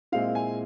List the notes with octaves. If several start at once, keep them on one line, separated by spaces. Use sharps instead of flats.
A#2 G#3 C4 E4 F5
G#5